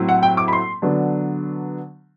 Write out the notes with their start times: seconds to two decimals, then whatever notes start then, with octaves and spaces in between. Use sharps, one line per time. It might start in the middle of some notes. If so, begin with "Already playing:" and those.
Already playing: A2 F#3 C4 E4
0.09 F#5
0.23 G5
0.37 D6
0.48 B5
0.53 C6
0.82 D3 F#3 B3 D4